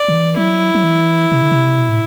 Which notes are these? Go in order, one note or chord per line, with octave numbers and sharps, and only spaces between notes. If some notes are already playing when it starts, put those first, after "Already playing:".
Already playing: D5
D3
E3
F#3 E4
F#3
E3
C3
D3
C3
B2
A2